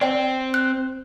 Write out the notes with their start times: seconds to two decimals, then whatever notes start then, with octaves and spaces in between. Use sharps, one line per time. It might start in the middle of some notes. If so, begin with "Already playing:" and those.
0.01 C4 D5 G5
0.54 F#6